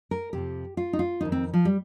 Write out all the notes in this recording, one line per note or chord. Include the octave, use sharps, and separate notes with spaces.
A#4
F2 C3 F3 G4
F4
D#4
F4
F2 D#3 D#4
C4
F3
G3